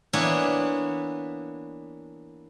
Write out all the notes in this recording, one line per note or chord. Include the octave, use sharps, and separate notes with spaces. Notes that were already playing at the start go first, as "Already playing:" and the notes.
E3 A#3 B3 D4 E4 C#5